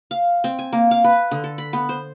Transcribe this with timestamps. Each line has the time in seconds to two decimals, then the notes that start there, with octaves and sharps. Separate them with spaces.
0.11 F5
0.44 C4
0.59 G#5
0.73 A#3
0.91 F5
1.04 B4
1.31 D3
1.44 A4
1.58 B5
1.73 B3
1.89 C5